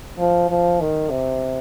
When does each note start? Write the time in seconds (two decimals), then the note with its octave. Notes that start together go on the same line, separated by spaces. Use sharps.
0.18 F3
0.50 F3
0.80 D#3
1.10 C3